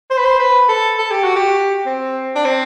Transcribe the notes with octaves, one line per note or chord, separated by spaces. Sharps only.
C5
B4
C5
B4
A4
A4
G4
F#4
G4
C4
D4
C4